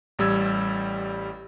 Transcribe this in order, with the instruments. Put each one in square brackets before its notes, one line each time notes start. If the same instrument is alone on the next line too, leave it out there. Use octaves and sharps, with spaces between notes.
[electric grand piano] A1 G3 E6 G#6